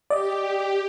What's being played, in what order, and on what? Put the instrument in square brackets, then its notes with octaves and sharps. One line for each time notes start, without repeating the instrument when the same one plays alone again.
[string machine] G4 [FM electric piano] D5 D#5